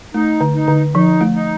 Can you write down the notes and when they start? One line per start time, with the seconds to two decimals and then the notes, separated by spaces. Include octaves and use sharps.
0.14 A3 D#4
0.41 D3
0.54 D#4
0.68 D3
0.94 F3 D#4
1.21 A3
1.34 D#4